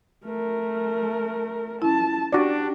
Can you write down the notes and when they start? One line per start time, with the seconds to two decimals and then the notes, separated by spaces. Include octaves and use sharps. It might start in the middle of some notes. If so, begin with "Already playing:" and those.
0.24 A3 A#4
1.82 C#4 E4 A5
2.33 D4 F#4 G4 D5